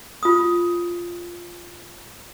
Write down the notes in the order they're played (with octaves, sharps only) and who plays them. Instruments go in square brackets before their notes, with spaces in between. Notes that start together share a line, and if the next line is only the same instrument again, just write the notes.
[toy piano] F4 D#6